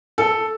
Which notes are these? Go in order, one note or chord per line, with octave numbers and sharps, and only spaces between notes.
A4